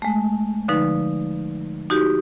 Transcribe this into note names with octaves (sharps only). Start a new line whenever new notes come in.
G#3 A3
D3 F3 D#4 B4
D#4 F#4 G4